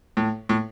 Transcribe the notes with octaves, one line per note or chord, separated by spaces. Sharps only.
A2
A2